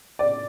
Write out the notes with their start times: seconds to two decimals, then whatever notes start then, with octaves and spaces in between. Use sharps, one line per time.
0.19 D5